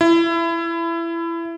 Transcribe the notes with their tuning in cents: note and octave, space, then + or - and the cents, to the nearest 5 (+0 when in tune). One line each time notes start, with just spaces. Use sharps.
E4 +25